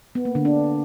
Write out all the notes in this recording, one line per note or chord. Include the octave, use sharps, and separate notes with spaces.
B3
A#3
D3
D4